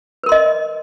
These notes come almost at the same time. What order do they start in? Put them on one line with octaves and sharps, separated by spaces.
B4 A#4 C6 D#5